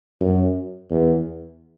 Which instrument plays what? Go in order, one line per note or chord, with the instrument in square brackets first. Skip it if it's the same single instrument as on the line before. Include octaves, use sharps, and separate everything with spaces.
[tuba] F#2
E2